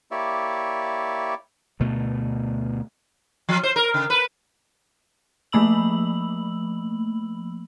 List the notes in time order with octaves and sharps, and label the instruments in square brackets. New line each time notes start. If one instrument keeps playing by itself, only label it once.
[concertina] A#3 E4 G4 C#5 D5 E5
[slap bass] D2 B2 A3
[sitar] F3
C5
A#4
C#3
B4
[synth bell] F3 A3 A#3 B5 E6 F#7